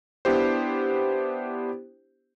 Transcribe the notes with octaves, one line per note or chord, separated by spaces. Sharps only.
B3 D4 E4 G4 C5